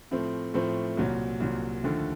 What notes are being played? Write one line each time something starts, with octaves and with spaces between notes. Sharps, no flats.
A2 F3 A3 C4
A2 F3 A3 C4
C2 A#2 F#3
C2 A#2 F#3
D#2 D3 F3 A3